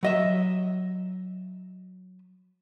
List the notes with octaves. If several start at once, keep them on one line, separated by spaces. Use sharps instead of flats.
F#3 D#5 E5